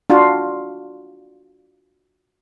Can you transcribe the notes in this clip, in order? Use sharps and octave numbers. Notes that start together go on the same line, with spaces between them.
D4 F4 F#4